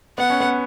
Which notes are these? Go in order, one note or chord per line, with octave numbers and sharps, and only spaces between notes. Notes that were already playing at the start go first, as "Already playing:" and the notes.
B3 F#5
C#4
B3